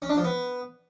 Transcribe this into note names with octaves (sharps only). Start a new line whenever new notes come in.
C#4
D4
F3
B3